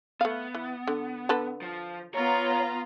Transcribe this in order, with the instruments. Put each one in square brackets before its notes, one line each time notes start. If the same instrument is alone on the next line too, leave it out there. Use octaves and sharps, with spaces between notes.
[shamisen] A3 F5 [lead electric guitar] B3
[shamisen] E3
D3
D3 A4 B4
[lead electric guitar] F3
[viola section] B3 F4 A#5 [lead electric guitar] C#5